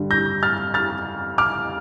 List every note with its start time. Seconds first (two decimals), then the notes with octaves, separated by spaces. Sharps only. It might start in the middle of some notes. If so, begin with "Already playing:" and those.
Already playing: G2 D3 G3
0.11 G6 A#6
0.43 F6 A6
0.74 F6 A6
1.38 D6 F6